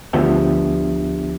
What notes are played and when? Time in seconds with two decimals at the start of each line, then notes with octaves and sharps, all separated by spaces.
0.13 D2 F3 B3 D4 G4 E5